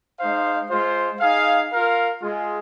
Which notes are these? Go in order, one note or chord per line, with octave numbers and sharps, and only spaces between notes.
G#3 D#4 C5 F5
G#3 F4 C5
D#4 G#4 F5
F4 A#4 F5
G#3 F4 G#4